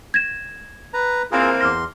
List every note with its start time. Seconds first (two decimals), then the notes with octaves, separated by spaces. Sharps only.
0.14 G#6 A#6 E7
0.94 B4 A#5
1.32 E3 A#3 C4 F4 G#4 A#4
1.61 E2 C6 D6 F6 A#6